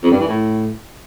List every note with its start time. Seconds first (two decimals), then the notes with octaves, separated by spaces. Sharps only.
0.03 F2
0.11 G2
0.19 E3
0.27 A2